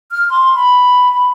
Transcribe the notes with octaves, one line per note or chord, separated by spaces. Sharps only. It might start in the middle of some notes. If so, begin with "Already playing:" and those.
F6
C6
B5